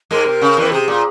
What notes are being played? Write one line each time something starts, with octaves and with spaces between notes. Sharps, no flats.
G#2 G#3 A#4
C3
C#3
E2 E3
C3 G#4
A#2